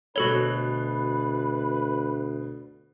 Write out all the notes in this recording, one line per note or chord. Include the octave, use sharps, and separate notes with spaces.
D2 B2 F#4 A4 B4 C#5 F#7 G7